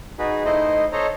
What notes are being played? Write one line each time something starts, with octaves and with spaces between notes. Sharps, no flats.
D#4 F#4 G#4 B4
A3 D#4 E4 C5 D#5
A4 C5 C#5 D#5 A#5